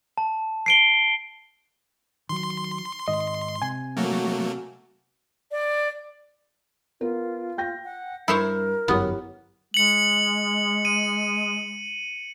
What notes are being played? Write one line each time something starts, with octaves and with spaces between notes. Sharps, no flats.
A5
C7 D7 G7
D#3 F#3 C6
G#2 D#3 D#5
C3 G#5
F#3 A3 A#3 F#4
D5
B3 F4 A#4
G5 G6 A#6
F#5
G2 E4 A#4 C5 C#5
G1 F#2 B3 E4 G4 C#5
G#3 C#7 F#7
D#7